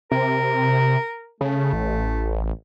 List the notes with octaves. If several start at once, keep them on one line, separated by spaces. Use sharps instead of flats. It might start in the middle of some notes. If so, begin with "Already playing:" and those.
C3 A#4
C#3 A3
A1